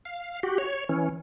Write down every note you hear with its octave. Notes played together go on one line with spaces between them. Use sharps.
F5
F#4 G4
C#5
E3 C#4